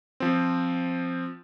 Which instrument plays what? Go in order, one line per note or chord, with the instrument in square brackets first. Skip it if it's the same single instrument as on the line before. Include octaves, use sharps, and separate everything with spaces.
[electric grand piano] F3 C4